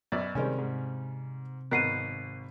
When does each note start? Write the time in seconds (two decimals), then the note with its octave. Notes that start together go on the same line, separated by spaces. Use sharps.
0.12 F#2 B2 D5
0.35 C3 D#3 G3 G#3 C4 C#4
0.58 G#2
1.71 G#1 B2 A#4 F#5 F#6 C7 D#7